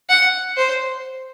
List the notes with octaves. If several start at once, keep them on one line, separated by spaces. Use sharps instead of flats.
F#5
C5